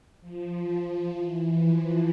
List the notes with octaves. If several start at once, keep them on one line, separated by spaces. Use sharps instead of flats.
F3
E3
F3